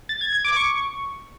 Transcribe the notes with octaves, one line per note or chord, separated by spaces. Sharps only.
A6
G#6
G#6
D6
C#6